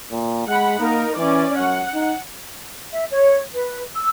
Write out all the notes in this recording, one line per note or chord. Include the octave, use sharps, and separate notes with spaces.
A#2
G#3 F#5 B5
A#3 D#4 A#4
E3 C#4 D5
F#2 F#5
D#4
E5
C#5
B4
E6